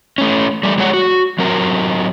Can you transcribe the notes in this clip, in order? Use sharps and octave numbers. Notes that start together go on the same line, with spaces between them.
A3 C#4
G3 A3
F#3 G#3 F#4 C#5 F#5
F#4
F#3 C4 A#4